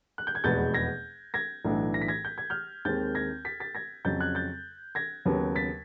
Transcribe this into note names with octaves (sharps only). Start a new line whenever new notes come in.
F#6
G6
G#6
F1 E2 B2 G#3 B3 G6 A6
G#6 A#6
G#6 A#6
B1 A2 E3 A3 D4
A#6
B6
G#6 A#6
G6
G#6
F6 G6
D#2 D#3 G#3 C4 G6 A6
G#6 A#6
A6 B6
A6 B6
G#6 A#6
F2 C#3 F#3 G6 A6
F#6 G#6
G6 A6
G#6 A#6
D#2 C#3 F#3 B3
A6 B6